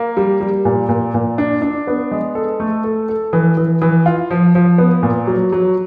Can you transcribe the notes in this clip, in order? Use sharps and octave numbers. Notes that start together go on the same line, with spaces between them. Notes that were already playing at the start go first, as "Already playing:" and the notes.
Already playing: A#3
G3
G3
A#2
A#2
A#2
D4
D4
B3
G#3
A4
A3
A4
A4
E3
E3
E3
F4
F3
F3
B3
A#2
F#3
F#3